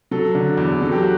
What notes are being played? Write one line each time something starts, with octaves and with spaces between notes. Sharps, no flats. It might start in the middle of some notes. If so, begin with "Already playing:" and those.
F#3 A4
D3
E2
F#3 A4
G4
F#4